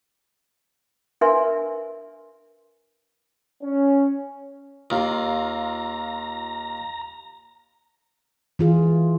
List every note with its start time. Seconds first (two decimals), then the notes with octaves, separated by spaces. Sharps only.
1.21 D4 A#4 B4 E5 G#5 C6
3.62 C#4
4.90 D#2 F4 F5 A#5
8.59 E3 F4 G#4